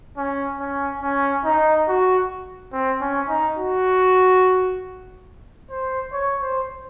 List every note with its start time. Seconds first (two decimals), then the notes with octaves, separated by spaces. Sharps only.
0.18 C#4
0.60 C#4
1.02 C#4
1.45 D#4
1.88 F#4
2.73 C4
3.01 C#4
3.29 D#4
3.58 F#4
5.70 C5
6.13 C#5
6.42 C5